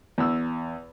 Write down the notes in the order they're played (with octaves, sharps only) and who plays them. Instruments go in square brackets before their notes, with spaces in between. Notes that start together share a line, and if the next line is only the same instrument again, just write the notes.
[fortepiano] E2 E6